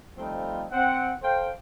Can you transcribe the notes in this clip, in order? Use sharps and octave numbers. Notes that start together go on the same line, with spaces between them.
F3 G3 A3 C4 D#4 F4
C4 F#5
A4 C5 F5 G5